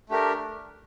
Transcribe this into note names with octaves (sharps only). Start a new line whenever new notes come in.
A3 D4 G4 A#4